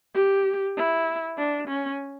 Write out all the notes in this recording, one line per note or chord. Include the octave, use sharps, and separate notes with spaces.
G4
E4
D4
C#4